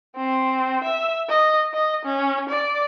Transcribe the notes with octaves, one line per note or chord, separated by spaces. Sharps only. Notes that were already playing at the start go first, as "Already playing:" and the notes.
C4
E5
D#5
D#5
C#4
D5